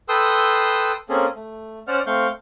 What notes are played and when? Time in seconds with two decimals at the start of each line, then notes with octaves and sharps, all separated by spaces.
0.09 A4 B4 G5 C6 D#6 E6
1.09 A#3 C4 C#4 G#4 A4
1.35 A3
1.88 C#4 C5 D5 F#5 F6
2.06 A3 C4 F5 C#6 G6